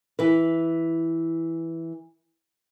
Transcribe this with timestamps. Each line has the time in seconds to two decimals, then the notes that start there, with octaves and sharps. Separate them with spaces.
0.19 E3 B4